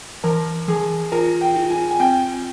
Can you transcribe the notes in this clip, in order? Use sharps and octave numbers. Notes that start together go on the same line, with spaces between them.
E3 A#4
E3 G#4
F4 A#4
G5
F4
G#5
G#5
C4 G5